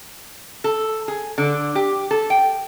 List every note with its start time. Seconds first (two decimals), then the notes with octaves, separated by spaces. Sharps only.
0.64 A4
1.08 G#4
1.38 D3
1.75 G4
2.11 A4
2.30 G5